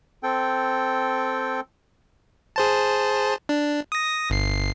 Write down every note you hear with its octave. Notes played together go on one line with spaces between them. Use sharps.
C4 A4 G5
G#4 C5 A5
D4
D#6 A#6
G1 C7